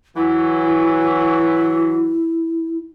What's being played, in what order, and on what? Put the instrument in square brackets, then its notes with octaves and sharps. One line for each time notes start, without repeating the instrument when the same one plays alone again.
[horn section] E3 F#3 [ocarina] E4